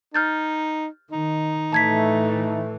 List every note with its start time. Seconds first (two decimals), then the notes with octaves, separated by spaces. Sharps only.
0.14 D#4 F6 G6 A6
1.11 D#3 D#4
1.72 A2 E3 A3 A5 G#6 B6